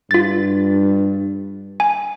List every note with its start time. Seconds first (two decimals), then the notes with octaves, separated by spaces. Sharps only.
0.11 G2 F4 A6
1.80 G#5